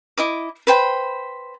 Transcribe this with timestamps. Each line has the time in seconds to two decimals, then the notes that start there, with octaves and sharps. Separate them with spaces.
0.17 E4 D#5 D6
0.67 B4 C5 G5 B5